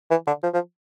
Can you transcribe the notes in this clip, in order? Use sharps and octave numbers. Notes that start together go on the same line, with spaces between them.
E3
D3
F3
F3